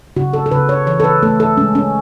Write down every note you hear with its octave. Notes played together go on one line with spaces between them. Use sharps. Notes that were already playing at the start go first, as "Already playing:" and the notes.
C#3 F#4
A4
A4
C#3 B4
C#5
E3 C#5
A4
B4
A3 A4
A4
G#3 C#4
C#4